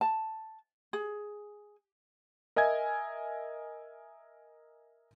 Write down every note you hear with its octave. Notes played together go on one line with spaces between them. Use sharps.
A5
G#4
A#4 D#5 E5 G#5 G#6